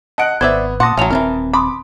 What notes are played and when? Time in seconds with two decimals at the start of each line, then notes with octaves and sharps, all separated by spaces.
0.18 D#5 F#5 A5 F#6 D7
0.41 G#1 B3 C5 D5 E5 G#6
0.80 A#2 F#5 A5 C6 D6 D#6 A#6
0.97 A1 F#3 G#3 C#4 E5 F7
1.10 D#1 E3 A3 C4 A#4
1.53 A5 B5 C6 D6 D#6